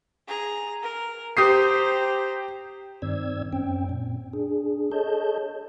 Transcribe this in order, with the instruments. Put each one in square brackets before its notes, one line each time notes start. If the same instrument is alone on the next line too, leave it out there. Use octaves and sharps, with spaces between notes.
[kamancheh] G#4 A#5
A#4
[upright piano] G4 D#6 C7 [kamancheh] C5 A#5
[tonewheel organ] G2 D#3 C4 D5 E6 G#6
F#2 C4 C#4 G5
A#2
D4 G#4
G#4 A4 C#5 D#5 A5 G6